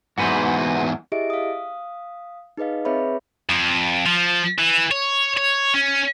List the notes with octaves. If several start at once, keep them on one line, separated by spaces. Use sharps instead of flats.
E2 G#2 F#4 B4 C5
E4 G4 G#4 D#5 E5 D7
F5 D#6
D#4 G#4 B4 D#5 F5
C4 G#4 B4 C#5 E5 B5
F2
F3
E3
C#5
C#5
C#4